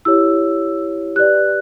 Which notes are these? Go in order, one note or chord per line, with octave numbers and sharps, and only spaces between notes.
E4 G4 C#5 E6
G4 B4 D5 F#6